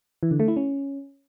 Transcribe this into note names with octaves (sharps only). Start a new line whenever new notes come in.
E3
D3
A3
E4
C#4